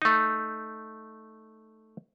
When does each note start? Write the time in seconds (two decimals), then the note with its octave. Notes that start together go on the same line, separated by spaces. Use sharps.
0.02 A3 D#4